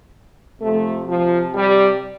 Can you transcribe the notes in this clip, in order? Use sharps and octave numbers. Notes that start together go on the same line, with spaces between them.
C3 F3 A3
F3
G3